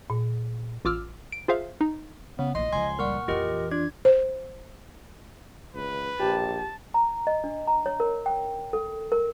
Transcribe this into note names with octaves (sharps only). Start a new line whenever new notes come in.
A#2
A1 F4 D6 E6 F6
D7
F4 G#4 C5 E5 F5
D#4
C#3 B3
A#1 E4 D#5 C6
C#2 F3 G#5 C6
A#2 G3 F#5 C#6 F6
F2 E3 F4 G4 A#4 D#5
D4 F4 G#6
C5
C#2 B4
A#1 G4 A5
A#5
D#5
D4
A#5
C#5
A#4
G5
A4
A#4